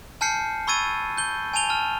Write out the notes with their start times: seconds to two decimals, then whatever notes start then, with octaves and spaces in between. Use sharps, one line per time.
0.21 G#5 A5 F6 G6 C7 C#7
0.67 B5 C#6 E6 G#6 A6 D#7
1.17 G6 G7
1.54 G#5 A5 D#7 F7 G7
1.69 A5 F6